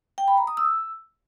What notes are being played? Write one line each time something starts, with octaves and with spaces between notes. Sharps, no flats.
G5
B5
A#5
D#6
E6